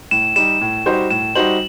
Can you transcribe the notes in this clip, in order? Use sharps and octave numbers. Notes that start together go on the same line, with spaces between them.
A2 E7
G3 D#4 E7
A2
G3 D#4 F#4 C5
A2 E7
G3 D#4 F#4 C5 F#7